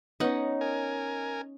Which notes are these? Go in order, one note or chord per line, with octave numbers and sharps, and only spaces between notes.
B3 C#4 D#4 B4 C#5 D#5 F#5
A#4 G#5